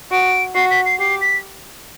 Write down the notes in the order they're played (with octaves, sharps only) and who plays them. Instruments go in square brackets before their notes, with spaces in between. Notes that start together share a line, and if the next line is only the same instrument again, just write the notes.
[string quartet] F#4 [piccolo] D7
[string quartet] F#4 [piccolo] C7
[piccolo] B6
C7
[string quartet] G4 [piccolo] C7
[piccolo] B6